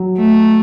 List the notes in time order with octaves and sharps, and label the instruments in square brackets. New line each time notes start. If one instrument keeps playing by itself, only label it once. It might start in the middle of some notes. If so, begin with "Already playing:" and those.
Already playing: [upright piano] F#3
[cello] A3